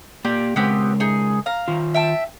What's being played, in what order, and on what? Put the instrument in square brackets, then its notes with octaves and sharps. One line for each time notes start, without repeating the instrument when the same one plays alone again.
[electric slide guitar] A#3 D5 [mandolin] G4
[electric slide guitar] C#3 G#3 A#4 [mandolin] B3 C4 G4
[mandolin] D#4 G#4
F5 A#5
[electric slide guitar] D#3 F4
[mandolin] E5 G5 A5